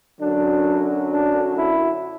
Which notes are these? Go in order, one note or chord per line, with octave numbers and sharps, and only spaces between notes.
F#2 D3 F#3 D4
D4
E4